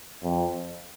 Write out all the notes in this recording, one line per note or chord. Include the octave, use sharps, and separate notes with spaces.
F2